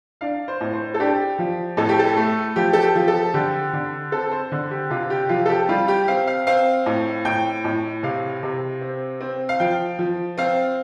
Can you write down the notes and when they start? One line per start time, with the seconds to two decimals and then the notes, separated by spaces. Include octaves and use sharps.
0.21 D4 F5
0.48 C5
0.61 A2
0.73 C5
0.94 A4
1.00 D4 G4
1.39 F3
1.77 A2 A4
1.89 G4
1.99 A4
2.16 A3
2.56 F3 G4
2.73 A4
2.82 G4
2.95 F3
3.08 A4
3.34 D3 G4
3.73 D3
4.12 C4 A4
4.32 C5
4.52 D3
4.71 G4
4.90 C3 F4
5.10 G4
5.29 F3 F4
5.46 A4
5.49 G4
5.69 G3 F4
5.88 G4
6.08 C4 F5
6.27 F5
6.47 C4 F5
6.86 A2
7.25 A2 G5
7.64 A2
8.03 C3 F5
8.43 C3
8.81 C4
9.21 C4
9.49 F5
9.60 F3 G5
9.99 F3
10.38 C4 F5